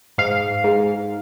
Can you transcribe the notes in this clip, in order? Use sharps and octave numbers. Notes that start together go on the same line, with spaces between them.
G#2 F5
G#2